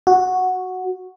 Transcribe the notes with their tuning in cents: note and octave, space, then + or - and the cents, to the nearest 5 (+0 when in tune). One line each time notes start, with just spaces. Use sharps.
F#4 -5